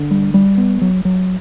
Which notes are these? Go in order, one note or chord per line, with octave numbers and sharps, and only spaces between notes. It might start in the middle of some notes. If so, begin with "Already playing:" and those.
Already playing: D3
G3
G3
B3
F#3
F#3